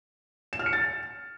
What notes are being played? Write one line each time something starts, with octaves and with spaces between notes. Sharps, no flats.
E7
F6
C#7
A6